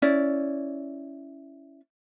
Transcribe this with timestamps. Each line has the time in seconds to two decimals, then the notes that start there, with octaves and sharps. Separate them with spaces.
0.02 C#4 E4 D5